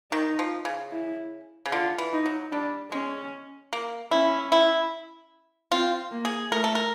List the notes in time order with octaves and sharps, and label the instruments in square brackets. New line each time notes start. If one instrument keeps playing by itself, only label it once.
[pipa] D#3 [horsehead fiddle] D#4
[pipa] F3
C#3
[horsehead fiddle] E4
[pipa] C#3
[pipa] D3 [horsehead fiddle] F4
[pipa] E3
[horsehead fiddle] D#4
[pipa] F#3
[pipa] G3 [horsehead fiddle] D4
[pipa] G#3 [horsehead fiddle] C#4
[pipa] A#3
[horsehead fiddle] C#4 [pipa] E4
[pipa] E4
[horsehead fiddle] C4 [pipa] F4
[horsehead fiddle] A#3
[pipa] G#4
[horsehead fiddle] A3 [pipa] A#4
[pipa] A4
A#4